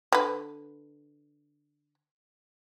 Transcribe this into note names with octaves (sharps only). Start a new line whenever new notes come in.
D3 B4